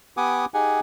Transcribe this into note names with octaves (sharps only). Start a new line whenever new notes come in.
B3 G4 F#5 G#5 D6 D#6
D#4 G4 G#4 F#5 G#5